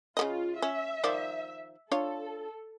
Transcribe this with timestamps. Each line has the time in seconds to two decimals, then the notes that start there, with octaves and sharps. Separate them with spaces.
0.17 C#3 A#3 F4 D#5
0.62 C#4 E5
1.04 D#3 F3 D5
1.91 D4 F4 A4 C#5